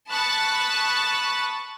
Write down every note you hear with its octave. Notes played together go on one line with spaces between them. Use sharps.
A5 B5 C#6 D#6 F#6 A6